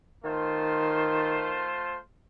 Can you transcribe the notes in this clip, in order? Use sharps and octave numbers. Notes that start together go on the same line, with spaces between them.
D#3 A3 F4 C5